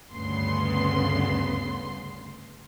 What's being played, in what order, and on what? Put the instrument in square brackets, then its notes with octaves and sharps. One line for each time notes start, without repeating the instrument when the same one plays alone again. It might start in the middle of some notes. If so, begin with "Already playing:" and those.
[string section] D2 G2 C#3 B3 C6 C7